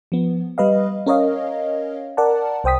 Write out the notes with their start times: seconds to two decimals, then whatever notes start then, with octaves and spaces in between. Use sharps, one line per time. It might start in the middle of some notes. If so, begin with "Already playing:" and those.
0.12 F3 B3
0.58 G3 B4 D#5 F5
1.06 C#4 A#4 C#5 D#5 F5
2.17 A#4 D5 F#5 A5
2.64 C2 C5 G5 D#6 B6